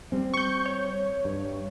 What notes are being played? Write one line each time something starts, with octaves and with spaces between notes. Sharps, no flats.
G3 C4
C#6 G6
C#5
G2